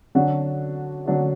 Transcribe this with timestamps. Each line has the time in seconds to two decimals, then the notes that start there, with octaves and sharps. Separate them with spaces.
0.15 D3 F#3 D4 F#4
1.06 D3 F#3 D4 F#4